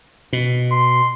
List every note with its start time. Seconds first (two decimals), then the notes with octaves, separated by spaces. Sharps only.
0.33 B2
0.71 C6